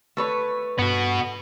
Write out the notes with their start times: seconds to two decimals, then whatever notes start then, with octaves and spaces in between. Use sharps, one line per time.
0.17 A3 B4 C#5
0.79 G2 B3 F#4